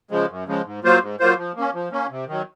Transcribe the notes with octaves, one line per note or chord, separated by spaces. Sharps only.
C#3 F3 G#3
F#2
C#3 F3 G#3
G#2
F#3 A#3 F4 C5
G#2
F#3 A#3 F4 C5
F3
A#3 C#4
F3
A#3 C#4
C3
D#3 F#3